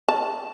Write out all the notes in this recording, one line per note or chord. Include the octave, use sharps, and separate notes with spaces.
A5